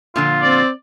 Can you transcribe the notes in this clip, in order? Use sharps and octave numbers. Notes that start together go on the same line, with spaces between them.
A#2 D3 F3 F4
C4 D5